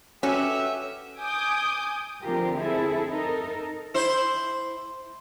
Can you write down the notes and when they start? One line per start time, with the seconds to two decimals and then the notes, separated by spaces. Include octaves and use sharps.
0.23 C#4 F#4 G4 A4 B4 E5
1.19 G#5 D6 D#6 G6
2.23 D3 F3 C4 F4 G4 A#4
2.57 C4 E4 G#4 A4
3.09 D#4 A4 A#4
3.94 E4 C5